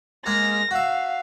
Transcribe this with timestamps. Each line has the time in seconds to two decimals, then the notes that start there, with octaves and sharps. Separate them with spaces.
0.26 G#3 A#3 G#4 F6 A#6
0.71 F#4 E5 F5